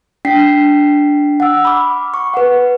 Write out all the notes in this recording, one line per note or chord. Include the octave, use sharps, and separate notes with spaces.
D4 G5 B6 C7
F#5 E6
B5 D6 F6
C#6
B4 F#5